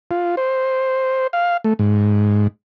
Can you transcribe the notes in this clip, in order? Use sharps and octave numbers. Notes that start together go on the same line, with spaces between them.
F4
C5
F5
A3
G#2